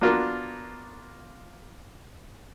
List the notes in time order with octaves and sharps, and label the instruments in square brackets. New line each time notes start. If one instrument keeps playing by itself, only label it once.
[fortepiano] A#3 B3 D4 F4 F#4 A#4